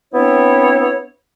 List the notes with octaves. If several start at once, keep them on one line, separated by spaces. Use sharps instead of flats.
B3 C4 D4 E4 C#5